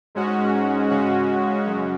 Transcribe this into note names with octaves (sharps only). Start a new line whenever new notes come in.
G#2 G#3 C#4 F#4
C#3 G#3 C#4 F#4
F#2